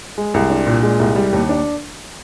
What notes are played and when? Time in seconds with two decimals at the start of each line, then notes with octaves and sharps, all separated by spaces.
0.18 G#3
0.34 C2
0.50 D4
0.67 A#2
0.83 G#3
0.99 C2
1.16 G3
1.33 D#2
1.49 D4